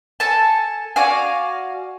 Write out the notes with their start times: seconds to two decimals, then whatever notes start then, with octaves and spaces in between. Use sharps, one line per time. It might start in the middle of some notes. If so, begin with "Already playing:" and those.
0.20 A4 G#5 A5
0.96 F#4 D5 F5 G#5